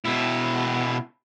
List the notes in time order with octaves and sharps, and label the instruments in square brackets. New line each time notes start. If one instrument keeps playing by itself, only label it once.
[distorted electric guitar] B2 E4